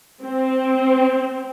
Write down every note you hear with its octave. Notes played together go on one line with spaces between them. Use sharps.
C4